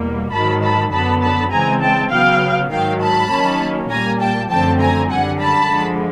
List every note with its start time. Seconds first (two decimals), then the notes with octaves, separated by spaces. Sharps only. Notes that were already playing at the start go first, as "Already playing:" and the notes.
Already playing: E2 B2 G3 A#3
0.32 G#2 D#3 F#3 A5 B5
0.62 A5 B5
0.92 F#2 D3 F#3 B3 A5 B5
1.22 A5 B5
1.51 C#3 E3 G#3 C4 G#5 A#5
1.81 G5 A5
2.11 C#3 F#3 B3 F5 G5
2.71 G#2 D#3 F#3 F5 G5
3.01 A5 B5
3.31 D#3 F#3 A#3 C#4
3.90 A#2 G3 A#3 G#5 A#5
4.21 G5 A5
4.50 F#2 D3 F3 A3 C4 G5 A5
4.80 G#5 A#5
5.10 F#2 D3 G3 F#5 G#5
5.40 A5 B5
5.70 D3 F3 G#3